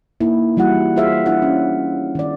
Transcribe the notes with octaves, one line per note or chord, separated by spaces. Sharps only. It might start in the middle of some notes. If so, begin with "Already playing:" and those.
A#3 D#4 E4
E3 G3 E4 F#4 F#5
F4 G#4 C5 E5 F5
D4 E4 E5 F#5
C#4
D#3 D5